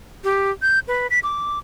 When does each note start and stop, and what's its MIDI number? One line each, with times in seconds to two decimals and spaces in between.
0.24 0.51 67
0.62 0.79 91
0.88 1.07 71
1.10 1.19 95
1.23 1.59 86